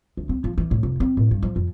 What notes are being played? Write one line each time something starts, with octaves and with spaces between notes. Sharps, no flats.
D2
C4
F3
E3
A2
F1
C4
A2
G2
F3
F2